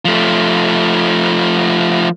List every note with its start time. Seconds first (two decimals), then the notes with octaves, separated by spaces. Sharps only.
0.05 F3 A3